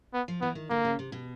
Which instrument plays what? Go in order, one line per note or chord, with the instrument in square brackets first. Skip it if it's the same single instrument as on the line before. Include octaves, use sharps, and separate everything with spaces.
[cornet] B3
[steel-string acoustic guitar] F3
[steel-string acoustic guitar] E3 [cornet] B3
[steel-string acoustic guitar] D#3
[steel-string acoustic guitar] D3 [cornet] A#3
[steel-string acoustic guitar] C#3
C3
B2